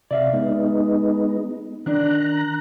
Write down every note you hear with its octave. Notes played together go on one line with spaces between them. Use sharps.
C3 D5 E5 F5
G#3 B3 D#4
D#3 D4 A#5 F#6